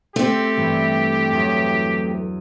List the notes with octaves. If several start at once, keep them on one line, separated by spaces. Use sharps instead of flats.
A3 C4 G4
G2 E3 G3
E2 F#3